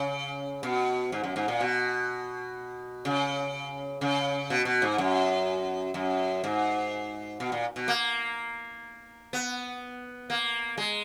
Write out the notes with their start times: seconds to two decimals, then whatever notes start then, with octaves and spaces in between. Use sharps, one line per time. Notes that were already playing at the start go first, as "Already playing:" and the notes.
Already playing: C#3
0.63 B2
1.12 G#2
1.24 F#2
1.36 G#2
1.48 A#2
1.61 B2
3.05 C#3
4.01 C#3
4.50 B2
4.65 B2
4.82 G#2
4.98 F#2
5.94 F#2
6.44 G#2
7.40 B2
7.52 A#2
7.76 B2
7.88 A#3
9.33 B3
10.30 A#3
10.77 G#3